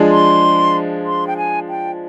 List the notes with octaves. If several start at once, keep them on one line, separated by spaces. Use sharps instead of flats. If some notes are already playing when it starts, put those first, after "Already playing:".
Already playing: F3 G#3 D4 G#4
C6
C6
G5
G#5
G5